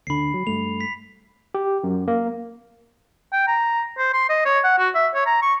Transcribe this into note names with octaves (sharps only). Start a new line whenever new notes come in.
D2 D3 B5 C7
F#3
G2 A3 F7
B6
G4
F#2
A#3
G5
A#5
C5
C6
D#5
C#5
F#5
F#4
E5
C#5
A#5
C#6